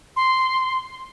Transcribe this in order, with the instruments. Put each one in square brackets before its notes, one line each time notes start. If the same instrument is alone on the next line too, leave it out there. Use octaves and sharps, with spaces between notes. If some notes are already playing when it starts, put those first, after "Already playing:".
[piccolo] C6